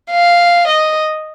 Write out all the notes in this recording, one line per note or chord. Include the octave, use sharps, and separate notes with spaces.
F5
D#5